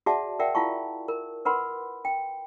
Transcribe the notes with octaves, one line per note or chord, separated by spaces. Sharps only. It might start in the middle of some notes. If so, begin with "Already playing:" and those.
F#4 G#4 D5 E5 F#5 A5
A#4 D5 E5 F#5 G5
E4 F4 F5 A5 C#6
A#4
A#4 B4 F#5 B5 C6
G5